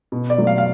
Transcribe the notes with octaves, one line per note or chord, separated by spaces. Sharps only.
B2
D5
F#3 A3
F5
F5